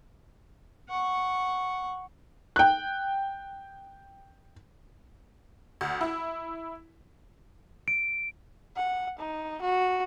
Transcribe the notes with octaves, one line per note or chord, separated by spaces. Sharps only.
F#5 C#6
G5 F#6
D2
E4
D7
F#5
D#4
F#4